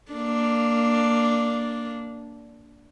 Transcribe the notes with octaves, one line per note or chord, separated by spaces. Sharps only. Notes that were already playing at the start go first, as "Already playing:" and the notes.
A#3 D4